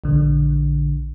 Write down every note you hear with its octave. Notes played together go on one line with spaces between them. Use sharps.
A#1 D3